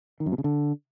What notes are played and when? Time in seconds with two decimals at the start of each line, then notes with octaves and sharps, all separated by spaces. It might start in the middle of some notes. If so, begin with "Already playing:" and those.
0.20 D#3
0.26 F#2
0.32 B2
0.38 C#3
0.44 D3